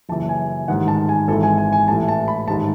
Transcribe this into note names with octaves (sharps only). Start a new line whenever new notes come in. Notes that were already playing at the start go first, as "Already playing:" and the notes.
F#1 F#2 E3 A5
G#5
A1 G#2 D#3 F#5
A5
G#5
G#1 G#2 E3 A4
G#5
G#5
G#5
A1 A2 E3 A5
A5
B5
A1 G#2 D#3 A5